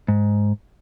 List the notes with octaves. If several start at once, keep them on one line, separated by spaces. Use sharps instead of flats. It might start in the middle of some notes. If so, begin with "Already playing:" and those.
G#2